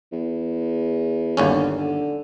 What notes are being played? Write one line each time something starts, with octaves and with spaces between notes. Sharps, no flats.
E2
G1 D#2 D3 C#4
D3